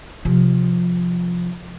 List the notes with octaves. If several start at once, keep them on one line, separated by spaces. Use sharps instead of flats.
C3 F3